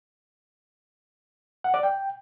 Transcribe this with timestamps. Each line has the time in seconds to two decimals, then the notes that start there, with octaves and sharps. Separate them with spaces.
1.64 F#5
1.74 D5
1.83 G5